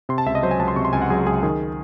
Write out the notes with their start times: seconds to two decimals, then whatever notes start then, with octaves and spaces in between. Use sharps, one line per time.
0.09 C3 C6
0.18 A5
0.26 C#2 E5
0.35 D#5
0.43 F#3 C5
0.51 G#5
0.59 C#2 A5
0.68 C6
0.76 C3 C#6
0.85 C6
0.93 C#2 G#5
1.02 F#5
1.10 F#3 G#4
1.26 C#2 G#4
1.43 D#3 G#4